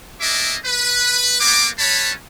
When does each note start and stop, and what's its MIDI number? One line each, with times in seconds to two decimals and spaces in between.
0.21 0.56 58
0.21 0.56 62
0.21 0.56 69
0.21 0.56 75
0.21 0.56 76
0.21 0.56 86
0.65 1.37 71
1.40 1.68 58
1.40 1.68 59
1.40 1.68 86
1.79 2.12 55
1.79 2.12 61
1.79 2.12 71
1.79 2.12 73
1.79 2.12 81
1.79 2.12 83